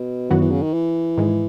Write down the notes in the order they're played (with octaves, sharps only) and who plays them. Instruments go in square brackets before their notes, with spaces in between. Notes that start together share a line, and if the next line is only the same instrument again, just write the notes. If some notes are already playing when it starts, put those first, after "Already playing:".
Already playing: [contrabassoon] B2
[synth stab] F#2 D#3 F#3 B3 F#4 [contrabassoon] E3
[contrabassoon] E3
C#3
D#3
E3
[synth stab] G#2 D#3 G#3